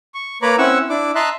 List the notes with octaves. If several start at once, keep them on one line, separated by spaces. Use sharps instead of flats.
C#6
A#3 B4 C#5 A#5 B5 D6
C4 C#4 E4 F#5 C#6 E6
D4 E4 D6
D#5 E5 A5 A#5 C6 F#6